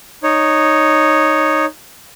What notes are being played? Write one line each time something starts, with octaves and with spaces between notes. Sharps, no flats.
D#4 C#5